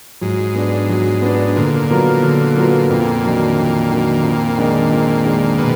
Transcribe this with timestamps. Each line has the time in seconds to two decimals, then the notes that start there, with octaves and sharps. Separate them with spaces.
0.21 G#2 F#3
0.55 B3 D4
0.89 F#3
1.22 B3 D4
1.56 A#2 D3
1.90 F#3 B3 F4 A#4
2.23 D3
2.56 F#3 B3 F4 A#4
2.90 F2 A#2
3.24 D#3 F#3 D4
3.57 F2
3.91 D#3 F#3 D4
4.24 F2
4.58 D#3 G#3 D4
4.91 F2
5.24 D#3 G#3 D4
5.58 B2